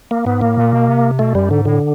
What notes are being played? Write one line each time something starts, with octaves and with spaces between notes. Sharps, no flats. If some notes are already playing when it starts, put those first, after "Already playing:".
A#3
G#2 B3
A2 A#3
A#2
B2
C3
B2 A3
F#2 G3
G#2 D3
A2 D3